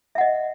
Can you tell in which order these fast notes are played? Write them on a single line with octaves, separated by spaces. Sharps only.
E5 F#5 D#5